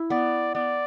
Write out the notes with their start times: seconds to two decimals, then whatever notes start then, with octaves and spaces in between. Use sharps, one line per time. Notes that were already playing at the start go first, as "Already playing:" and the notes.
Already playing: E4
0.10 B3 D5
0.55 B3 D5